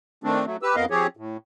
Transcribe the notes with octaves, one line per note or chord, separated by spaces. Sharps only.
D#3 A3 C4 D4
F#3 A3
G4 B4 E6
F2 B3 A#4 D#5 F5
F3 C4 G4 G#4 C#5
A2